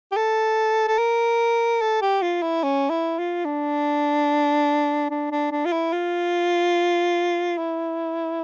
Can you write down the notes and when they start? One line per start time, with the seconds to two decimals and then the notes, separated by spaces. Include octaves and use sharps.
0.12 G4
0.16 A4
0.88 A4
0.98 A#4
1.81 A4
2.02 G4
2.22 F4
2.42 E4
2.63 C#4
2.90 E4
3.19 F4
3.45 D4
5.10 D4
5.32 D4
5.51 D4
5.65 F4
5.72 E4
5.93 F4
7.57 E4